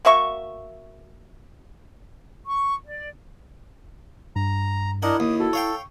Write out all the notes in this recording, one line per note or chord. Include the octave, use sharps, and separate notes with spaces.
A#3 F#4 E5 C#6
C#6
D5
G2 A#5
D4 E4 A#4 D#5 F#5
D#2 D#6
F#4 A4
C#5 F5 G5 C#6